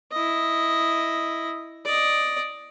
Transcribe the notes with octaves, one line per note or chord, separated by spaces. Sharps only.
E4 D#5
D5 D#5